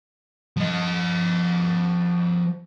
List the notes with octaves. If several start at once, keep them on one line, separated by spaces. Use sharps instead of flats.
F3 D#5